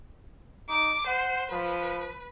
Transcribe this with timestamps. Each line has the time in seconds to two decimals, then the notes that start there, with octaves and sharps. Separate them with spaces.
0.69 D#4 D6
1.07 C5 F#5
1.51 F3 B4